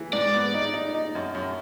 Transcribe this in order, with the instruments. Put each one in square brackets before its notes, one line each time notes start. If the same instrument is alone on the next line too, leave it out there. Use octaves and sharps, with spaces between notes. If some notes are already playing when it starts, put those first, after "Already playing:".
Already playing: [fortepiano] E3
[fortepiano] G#2 [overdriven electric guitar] D5
[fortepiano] B3
D#4
D#4
D#4
F#2
F#2